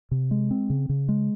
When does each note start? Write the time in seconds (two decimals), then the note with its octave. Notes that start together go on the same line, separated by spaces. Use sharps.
0.11 C3
0.31 G#3
0.51 C4
0.70 C#3
0.89 C#3
1.09 G#3